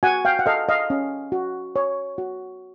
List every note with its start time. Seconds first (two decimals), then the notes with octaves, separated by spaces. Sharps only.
0.03 F#4 F#5 G#5
0.25 F5 G5
0.39 F#5
0.46 A4 D#5 F5
0.69 D#5 F5
0.90 C#4
1.32 F#4
1.76 C#5
2.18 F#4